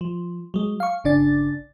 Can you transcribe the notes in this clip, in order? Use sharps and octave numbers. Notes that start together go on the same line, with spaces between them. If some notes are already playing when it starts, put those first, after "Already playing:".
F3
F#3 G#3
F5 C#6
G1 C#3 D4 D5 A6